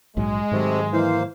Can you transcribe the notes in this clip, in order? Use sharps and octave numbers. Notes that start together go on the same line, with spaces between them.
A#1 G#2 F#3 G#3
G#2 C3 D#3 F#3 A3 C4
E3 A#3 C5 F5